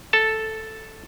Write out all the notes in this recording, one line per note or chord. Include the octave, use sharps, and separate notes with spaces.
A4 A5